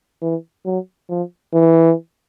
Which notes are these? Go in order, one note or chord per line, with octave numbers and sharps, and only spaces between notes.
E3
F#3
F3
E3